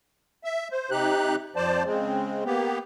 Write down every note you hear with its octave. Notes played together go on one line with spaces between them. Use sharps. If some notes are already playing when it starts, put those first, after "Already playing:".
E5
C5
C3 D#4 G4 F#6
F2 F3 C5 D5 A5
C#3 G#3 C4
A#3 B3 G4